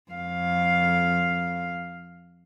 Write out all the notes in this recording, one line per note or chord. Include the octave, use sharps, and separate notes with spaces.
F2 F5